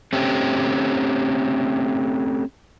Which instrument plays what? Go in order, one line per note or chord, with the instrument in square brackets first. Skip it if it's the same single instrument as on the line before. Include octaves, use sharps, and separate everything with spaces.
[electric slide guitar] A3 C4 C#4 G4